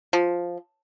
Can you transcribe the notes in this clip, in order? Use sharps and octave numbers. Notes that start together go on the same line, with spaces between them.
F3